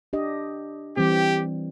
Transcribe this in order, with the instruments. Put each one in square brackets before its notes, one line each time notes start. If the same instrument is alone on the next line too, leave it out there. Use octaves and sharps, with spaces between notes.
[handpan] D4 G4 D#5
[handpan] E3 G3 C4 [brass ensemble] G4